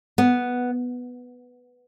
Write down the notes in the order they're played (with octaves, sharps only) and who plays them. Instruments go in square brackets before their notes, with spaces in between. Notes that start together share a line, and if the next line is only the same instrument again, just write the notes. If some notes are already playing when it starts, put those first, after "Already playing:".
[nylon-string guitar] B3